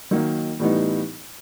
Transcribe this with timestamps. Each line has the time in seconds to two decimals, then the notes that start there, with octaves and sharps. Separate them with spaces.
0.11 D#3 F#3 A#3 D#4
0.59 A2 E3 G3 B3 D#4